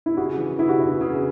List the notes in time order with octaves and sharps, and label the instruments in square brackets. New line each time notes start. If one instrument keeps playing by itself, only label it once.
[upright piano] E4
[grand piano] C#3 [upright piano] F#4
[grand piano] E3
[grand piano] C#3 [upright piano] E4
[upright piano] F#4
[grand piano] B3 [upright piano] E4
[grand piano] C#3